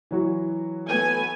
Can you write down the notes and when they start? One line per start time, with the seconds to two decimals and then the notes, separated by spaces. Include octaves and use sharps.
0.11 E3 F#3 F#4
0.88 A3 B3 G#5